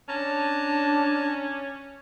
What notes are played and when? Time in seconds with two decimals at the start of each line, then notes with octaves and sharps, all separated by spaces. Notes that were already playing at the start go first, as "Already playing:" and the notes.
0.08 C#4 D4 A5 A#5